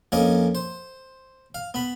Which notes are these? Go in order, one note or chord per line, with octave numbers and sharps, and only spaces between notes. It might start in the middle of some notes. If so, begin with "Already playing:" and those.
F2 A#3 C#4 C#5 D#5 G#5
C5
F5
B3 B5